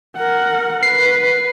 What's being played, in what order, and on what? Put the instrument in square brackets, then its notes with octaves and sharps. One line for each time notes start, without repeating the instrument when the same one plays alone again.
[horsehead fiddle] A#4 F#5
[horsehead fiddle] B4 [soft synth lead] C7